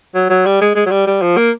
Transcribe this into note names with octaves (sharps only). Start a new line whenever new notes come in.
F#3
F#3
G3
G#3
G#3
F#3
G3
G3
F3
A#3